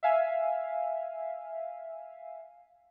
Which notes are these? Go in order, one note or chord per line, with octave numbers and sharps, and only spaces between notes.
E5 F5 G#5